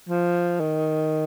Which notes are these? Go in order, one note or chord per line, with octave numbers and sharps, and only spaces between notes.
F3
D#3